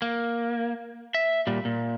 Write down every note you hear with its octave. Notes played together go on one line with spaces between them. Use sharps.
A#3
E5
A#2 G3
A#2